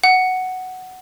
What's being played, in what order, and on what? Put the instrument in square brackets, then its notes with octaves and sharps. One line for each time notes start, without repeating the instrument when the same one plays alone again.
[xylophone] F#5